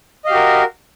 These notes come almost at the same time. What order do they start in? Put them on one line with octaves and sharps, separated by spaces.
D#5 F5 G4 F#4 A#4